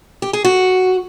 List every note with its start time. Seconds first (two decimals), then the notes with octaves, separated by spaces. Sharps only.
0.22 G4
0.33 G#4
0.45 F#4